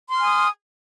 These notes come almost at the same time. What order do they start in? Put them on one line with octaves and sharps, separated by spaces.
C6 F6 G#5 D#6